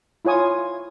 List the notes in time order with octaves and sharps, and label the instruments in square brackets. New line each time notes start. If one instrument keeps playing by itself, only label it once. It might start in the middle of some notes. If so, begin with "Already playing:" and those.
[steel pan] E4 F4 C#5 G#5 D#6